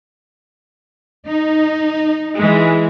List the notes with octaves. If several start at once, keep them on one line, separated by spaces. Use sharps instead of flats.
D#4
E3 G#3